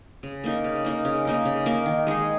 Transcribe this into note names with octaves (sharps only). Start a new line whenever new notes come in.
C#3
A#3 D#4 A#4
C#3
A#3 D#4 A#4
C#3
A#3 D#4 A#4
C#3
A#3 D#4 A#4
D#3
G#3 D#4 G#4